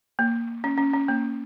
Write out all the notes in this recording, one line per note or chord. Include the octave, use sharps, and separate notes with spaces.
A#3
C#4
C#4
C#4
A#3